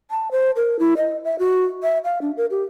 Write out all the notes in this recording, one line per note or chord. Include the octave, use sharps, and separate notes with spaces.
A5
C5
A#4
E4
D#5
E5
F#4
E5
F5
D4
A#4
G4